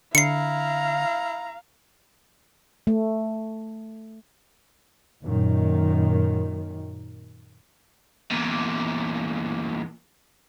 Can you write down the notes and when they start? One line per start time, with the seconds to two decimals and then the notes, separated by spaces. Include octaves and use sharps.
0.15 D3 E4 F5 A#5 C7 C#7
2.87 A3
5.24 F#2 A#2 D#3
8.31 E2 A#2